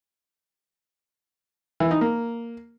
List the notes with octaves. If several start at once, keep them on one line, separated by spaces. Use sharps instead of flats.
E3
D#4
A#3